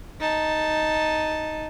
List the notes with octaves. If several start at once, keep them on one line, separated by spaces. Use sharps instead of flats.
D#4 A5